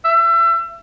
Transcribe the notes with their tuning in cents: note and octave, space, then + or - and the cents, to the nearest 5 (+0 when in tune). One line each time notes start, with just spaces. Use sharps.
E5 +30